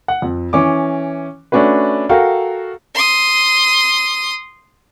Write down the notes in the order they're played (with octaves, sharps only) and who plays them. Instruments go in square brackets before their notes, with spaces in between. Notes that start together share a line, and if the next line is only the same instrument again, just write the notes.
[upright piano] F#5
F2
E3 C#4 D6
A3 C#4 D4 F#4 B4
F#4 A4 A#4 F5 G5
[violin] C6 D#6